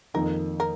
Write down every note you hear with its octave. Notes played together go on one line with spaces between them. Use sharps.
F2 D#3 A#3 D#4 A#4
A#4